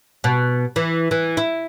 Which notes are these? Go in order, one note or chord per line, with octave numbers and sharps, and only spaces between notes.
B2
E3
E3
E4